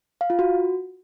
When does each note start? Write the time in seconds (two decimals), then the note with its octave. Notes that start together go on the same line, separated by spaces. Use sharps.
0.21 F5
0.30 F4
0.39 F#4